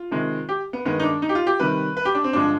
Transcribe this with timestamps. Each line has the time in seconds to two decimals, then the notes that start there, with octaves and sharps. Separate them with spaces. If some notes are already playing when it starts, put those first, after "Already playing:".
Already playing: F4
0.11 C3 D#3 G#3
0.49 G4
0.73 B3
0.85 G2 D#3 G#3 B3
1.00 D#4
1.03 D4
1.22 D#4
1.29 G4
1.35 F4
1.47 G4
1.60 C3 D#3 G3 B4
1.97 B4
2.05 G4
2.15 D4
2.24 C4
2.33 G2 D3 F3 G#3 D4